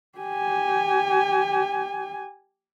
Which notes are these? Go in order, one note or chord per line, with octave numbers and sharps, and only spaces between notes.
G4 G#5